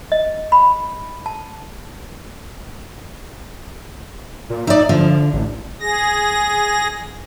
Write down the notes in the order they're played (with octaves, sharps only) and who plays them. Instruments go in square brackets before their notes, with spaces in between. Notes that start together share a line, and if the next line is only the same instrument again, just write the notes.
[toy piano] D#5
B5
A5
[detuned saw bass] A#2
[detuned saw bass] D#4 [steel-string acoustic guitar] D5 E5
[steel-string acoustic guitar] D3 [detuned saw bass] F3
[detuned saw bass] A1
[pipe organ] G#4 A#6